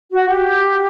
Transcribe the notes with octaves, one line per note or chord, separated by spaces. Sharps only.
F#4
G4